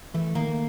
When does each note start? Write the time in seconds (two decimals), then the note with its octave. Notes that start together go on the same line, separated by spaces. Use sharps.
0.14 E3 A3
0.35 D#3 A#3